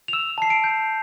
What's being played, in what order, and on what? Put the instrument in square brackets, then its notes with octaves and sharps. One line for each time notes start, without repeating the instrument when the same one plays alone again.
[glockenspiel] F7
E6 E7
A5 C7
D7
G6